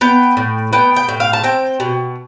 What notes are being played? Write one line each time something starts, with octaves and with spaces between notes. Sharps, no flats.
B3 G5
A2
B3 G5
G5
A2
F5
A5
C4 G5
B2